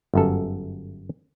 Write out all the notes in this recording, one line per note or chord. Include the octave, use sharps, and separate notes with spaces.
G1 F#2 A4